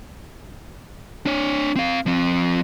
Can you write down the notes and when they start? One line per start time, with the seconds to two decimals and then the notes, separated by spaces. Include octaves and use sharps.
1.26 D4 C#5
1.76 C4 F5
2.06 F3 C4